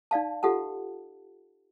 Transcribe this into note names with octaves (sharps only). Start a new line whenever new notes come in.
D#4 D5 F5 A5
F4 G4 A4 F#5 A5